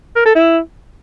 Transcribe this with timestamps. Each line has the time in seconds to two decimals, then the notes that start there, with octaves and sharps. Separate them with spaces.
0.16 A#4
0.26 A4
0.35 E4